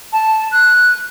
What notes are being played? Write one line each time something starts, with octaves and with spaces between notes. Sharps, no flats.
A5
F#6